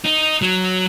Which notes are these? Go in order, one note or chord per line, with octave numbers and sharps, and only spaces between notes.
D#4
F#3